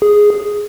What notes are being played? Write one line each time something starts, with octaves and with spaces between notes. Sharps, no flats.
G#4